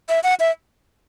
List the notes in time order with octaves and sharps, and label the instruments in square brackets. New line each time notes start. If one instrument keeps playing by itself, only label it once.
[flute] E5
F#5
E5